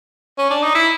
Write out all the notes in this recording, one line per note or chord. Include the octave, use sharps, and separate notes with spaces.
C#4
D4
D#4
E4